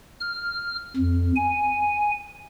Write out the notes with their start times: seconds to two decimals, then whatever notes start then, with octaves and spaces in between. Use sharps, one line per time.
0.20 F6
0.97 F2
1.36 G#5